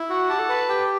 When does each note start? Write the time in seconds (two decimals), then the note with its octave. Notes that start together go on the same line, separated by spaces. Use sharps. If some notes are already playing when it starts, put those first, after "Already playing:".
Already playing: E4
0.10 F#4 F#5
0.29 G4 A5
0.39 A4
0.49 B4
0.69 G4 G5